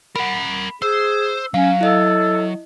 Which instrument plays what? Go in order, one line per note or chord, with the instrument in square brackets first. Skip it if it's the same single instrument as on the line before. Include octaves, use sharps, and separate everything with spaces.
[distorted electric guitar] A#4 F#5 [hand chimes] B5
[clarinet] G#4 [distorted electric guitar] C5 [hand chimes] E6
[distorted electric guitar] F#3 [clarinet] C#4 [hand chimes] F5
[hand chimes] E4 D#5 [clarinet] A4